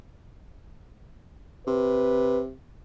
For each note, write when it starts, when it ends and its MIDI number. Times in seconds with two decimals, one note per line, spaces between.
1.67 2.53 48
1.67 2.41 71